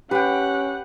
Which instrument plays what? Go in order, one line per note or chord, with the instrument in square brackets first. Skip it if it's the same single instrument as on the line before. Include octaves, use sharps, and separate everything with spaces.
[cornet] C#4 [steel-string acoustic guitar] G4 [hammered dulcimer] B4 G5 [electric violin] F#5